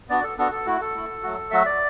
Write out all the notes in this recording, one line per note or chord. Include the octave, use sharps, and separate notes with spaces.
B3 D4 F#4 D5
A4
B3 D4 F#4 A4
A4
A3 E4 F#4
A4
A3 E4
F#3 A3 F#4
F#3 A3 F#4 E5
D5